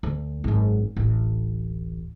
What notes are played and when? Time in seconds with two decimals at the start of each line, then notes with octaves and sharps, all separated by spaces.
0.03 D2
0.44 G#1 F#2
0.96 D1 A1